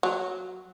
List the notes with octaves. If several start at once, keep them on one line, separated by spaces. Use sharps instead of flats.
F#3